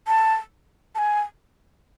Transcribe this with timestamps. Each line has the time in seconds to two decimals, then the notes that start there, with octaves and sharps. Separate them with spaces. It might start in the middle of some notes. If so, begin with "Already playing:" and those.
0.07 A5
0.95 A5
0.98 G#5